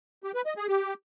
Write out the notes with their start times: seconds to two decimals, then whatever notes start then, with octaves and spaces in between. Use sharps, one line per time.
0.24 G4
0.35 B4
0.46 D#5
0.57 G#4
0.68 G4